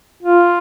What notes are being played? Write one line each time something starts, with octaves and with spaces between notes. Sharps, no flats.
F4